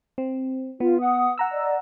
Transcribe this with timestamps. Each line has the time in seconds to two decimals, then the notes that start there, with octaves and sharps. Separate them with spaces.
0.18 C4
0.80 B3 F4
1.00 F#5 D#6
1.38 F#5 A#5 E6
1.52 D5 D#5